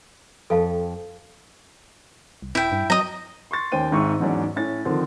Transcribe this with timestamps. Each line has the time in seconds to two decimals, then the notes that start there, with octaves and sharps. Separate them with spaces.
0.50 F2 A4 F5 A5
2.42 C2
2.55 D#1 E4 G5
2.72 G2
2.90 F#3 D#5 A#5
3.51 C6 C#6 A6
3.72 D#2 C#4 C5 G5 D#7
3.91 G#1 G#2 E5 C#6 E6
4.20 E2 G#2 F#3 C#4 D4 D5
4.56 A2 C#4 A6
4.85 D3 D#3 F3 C4